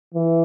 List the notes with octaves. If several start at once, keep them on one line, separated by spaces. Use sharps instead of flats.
E3